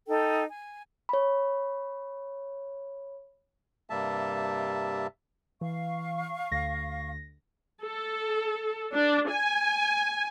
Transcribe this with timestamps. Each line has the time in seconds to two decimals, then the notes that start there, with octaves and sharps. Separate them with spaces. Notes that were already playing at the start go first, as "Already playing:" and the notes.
0.08 D#4 A4 G5
0.49 G#5
1.09 C#5 B5
3.90 G2 C3 G3 A#3 E5 A5
5.61 E3 F5 C#6
6.51 D2 D3 A#6
7.84 A4
8.94 D4
9.30 G#5